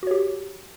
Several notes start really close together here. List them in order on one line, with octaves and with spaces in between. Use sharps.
F#4 C#5 G4